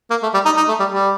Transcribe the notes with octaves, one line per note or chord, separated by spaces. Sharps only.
A#3
A3
G3
D#4
D#4
A3
G3
G3